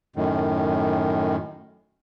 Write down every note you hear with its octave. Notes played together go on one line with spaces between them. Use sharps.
F#2 A2 D#3